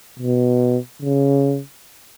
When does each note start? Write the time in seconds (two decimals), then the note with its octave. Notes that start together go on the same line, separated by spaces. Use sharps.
0.19 B2
1.02 C#3